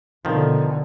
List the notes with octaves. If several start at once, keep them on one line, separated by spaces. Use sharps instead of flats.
B2 D3 D#3 F3